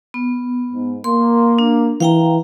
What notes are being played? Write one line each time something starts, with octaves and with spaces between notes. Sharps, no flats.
B3
G#2
A#3 C6
D4
E3 F5 G5 A#5